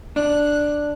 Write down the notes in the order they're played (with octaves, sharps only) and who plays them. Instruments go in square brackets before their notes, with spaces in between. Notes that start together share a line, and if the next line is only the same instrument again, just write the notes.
[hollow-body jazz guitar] D4 [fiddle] F#6